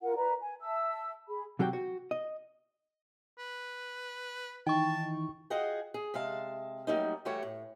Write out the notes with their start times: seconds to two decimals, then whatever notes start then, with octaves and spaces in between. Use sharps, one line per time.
0.02 F4 A#4 F#5
0.16 B4 D5 A#5
0.41 G#5
0.62 E5 A5 E6
1.28 G#4 B5
1.59 C3 F#3 F#4 G4 G5
1.73 F#4
2.11 D#5
3.39 B4
4.67 D#3 E3 D#4 G5 A5 C#6
5.50 F4 F#4 G#4 D#5 F#5 G5
5.94 G#4
6.14 C3 G#3 E5 F5 A5
6.87 F#3 G3 A3 A#3 C#4 D#4
7.25 E3 G3 A3 F#4 G4 C#5
7.43 A2